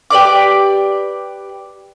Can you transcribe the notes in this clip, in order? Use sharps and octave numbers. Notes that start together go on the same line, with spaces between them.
G4 B4 D5 D6